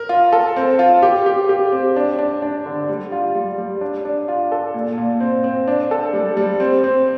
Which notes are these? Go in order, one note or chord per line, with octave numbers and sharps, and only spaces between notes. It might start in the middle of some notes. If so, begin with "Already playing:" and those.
Already playing: A#4
F4
A4
C4
F4
G4
G4
G4
C4
D4
D4
D4
D3
G3
F4
G3
G3
D4
D4
F4
A4
A#2
A#2
C4
C4
D4
A4
G3
G3
C4
C4